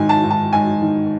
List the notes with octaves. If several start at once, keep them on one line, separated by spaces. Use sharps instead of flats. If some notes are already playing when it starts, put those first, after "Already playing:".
Already playing: G#2 D#3 G#5
A5
G#2
A5
G#2 G#5
D#3